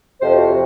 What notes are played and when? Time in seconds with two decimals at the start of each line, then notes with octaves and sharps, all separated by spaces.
0.21 F2 C3 F3 C5
0.35 F#4
0.50 C3